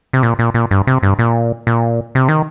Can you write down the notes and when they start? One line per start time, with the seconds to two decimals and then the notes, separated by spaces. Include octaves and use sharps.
0.13 C3
0.23 A#2
0.39 A#2
0.54 A#2
0.71 G2
0.87 C3
1.03 G2
1.19 A#2
1.67 A#2
2.15 C3
2.28 D#3